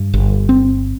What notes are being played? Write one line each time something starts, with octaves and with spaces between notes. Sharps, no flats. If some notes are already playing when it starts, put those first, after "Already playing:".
Already playing: G2
G1
C4